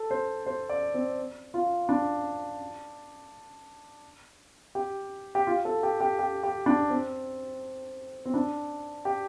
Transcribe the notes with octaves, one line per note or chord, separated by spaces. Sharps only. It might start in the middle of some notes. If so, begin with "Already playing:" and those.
Already playing: A4
C5
C5
D5
C4
F4
D4
G4
G4
F4
A4
G4
G4
G4
G4
D4
C4
C4
D4
G4